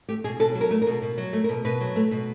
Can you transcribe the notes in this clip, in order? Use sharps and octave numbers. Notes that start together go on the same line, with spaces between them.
A3 G4
B2 G#4
B2 A4
F#3
A#4
A3
A#4
B2
B2
F#3
A3
A#4
B2
B2 B4
F#3
A3
B2